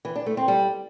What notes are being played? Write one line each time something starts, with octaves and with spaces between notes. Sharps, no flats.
E3
D4
A3
C4
G3